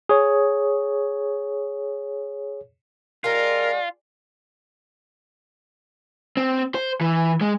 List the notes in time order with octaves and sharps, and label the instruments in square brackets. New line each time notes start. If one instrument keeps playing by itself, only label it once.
[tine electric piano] G#4 C#5
[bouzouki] G#3 D4 G4 [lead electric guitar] F4 [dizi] A#4
[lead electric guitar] C4
C5
E3
G#3